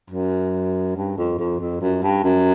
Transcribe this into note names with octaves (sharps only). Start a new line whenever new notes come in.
F#2
G2
F2
F2
F2
F#2
G2
F#2